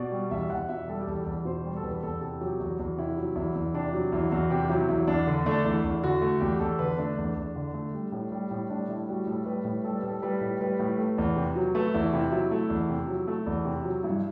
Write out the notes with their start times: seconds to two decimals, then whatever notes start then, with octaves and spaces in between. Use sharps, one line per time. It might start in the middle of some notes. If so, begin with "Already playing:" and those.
Already playing: B2 D5
0.11 G3
0.31 E2 E5
0.50 E2 F#5
0.69 B2 E5
0.88 G3 A4
1.01 G4
1.07 E2 A4
1.26 E2
1.45 B2 C5
1.64 G3
1.76 A4
1.83 E2 B4
2.03 E2 A4
2.21 C3 A4
2.41 F#3 G4
2.60 E2 F#4
2.79 E2
2.97 C3 E4
3.18 F#3
3.35 E2 E4
3.55 E2
3.74 C3 D4
3.93 F#3
4.12 E2 E4
4.31 E2 F#4
4.50 C3 G4
4.69 F#3 E4
4.89 E2 E4
5.07 E2 D4
5.27 D3
5.46 A3 D4
5.65 E2 E4
5.84 E2
6.03 D3 F#4
6.22 A3
6.40 E2 G4
6.60 E2 A4
6.79 D3 B4
6.98 A3 D4
7.18 E2
7.36 E2
7.56 D3
7.74 A3
7.94 G3
8.12 A2
8.32 G3
8.51 A2
8.70 G3 D4
8.89 A2 E4
9.08 G3 F#4
9.27 A2 A4
9.46 G3 B4
9.65 A2
9.84 G3 A4
9.97 B4
10.03 A2
10.09 A4
10.22 G3 B4
10.41 A2
10.61 G3 B4
10.79 A2
10.98 A3
11.18 E2
11.36 C3
11.56 F#3
11.75 A3 B4
11.94 E2 E4
12.13 C3 E4
12.31 F#3 E4
12.51 A3
12.70 E2
12.89 C3
13.08 F#3
13.28 A3
13.46 E2
13.65 C3
13.84 F#3
14.03 G2 E4